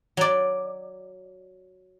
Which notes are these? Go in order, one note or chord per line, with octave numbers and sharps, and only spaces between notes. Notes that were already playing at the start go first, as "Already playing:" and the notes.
F#3 D5